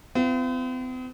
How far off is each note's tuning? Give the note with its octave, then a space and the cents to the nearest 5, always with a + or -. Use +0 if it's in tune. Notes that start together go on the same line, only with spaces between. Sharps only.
C4 -45 F4 -35